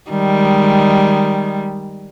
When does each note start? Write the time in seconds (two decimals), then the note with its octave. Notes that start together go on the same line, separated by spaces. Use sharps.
0.10 D#3 G3 G#3